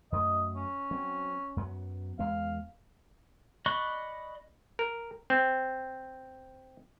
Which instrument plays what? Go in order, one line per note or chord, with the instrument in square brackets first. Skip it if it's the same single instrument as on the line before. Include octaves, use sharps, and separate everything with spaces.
[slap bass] F#2 F#3 A3 [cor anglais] D#5
[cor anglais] C#4
[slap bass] F#3 C4
F#2 F#3 B3
[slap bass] E2 G#3 B3 [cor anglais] F5
[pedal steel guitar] D5 D#5 B5 C#6 F#6
[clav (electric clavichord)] A#4
C4